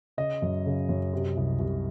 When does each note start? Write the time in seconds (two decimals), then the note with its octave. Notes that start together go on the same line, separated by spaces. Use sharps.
0.17 C#3 D#5
0.42 F#2
0.66 C#3
0.89 F#2
1.13 C3
1.37 C2
1.59 C2